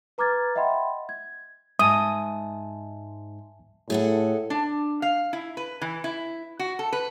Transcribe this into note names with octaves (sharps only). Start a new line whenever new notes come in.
B4 A#5 D6 F6 G#6 A6
D#5 E5 F#5 G5 B5 C6
G#6
G#2 E5 G#5 A5 D#6
A2 G#4 A4 F#5
D4
F5
E4
B4
E3
E4
F#4
A4
B4